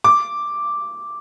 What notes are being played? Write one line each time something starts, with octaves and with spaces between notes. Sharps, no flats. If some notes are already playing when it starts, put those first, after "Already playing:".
D6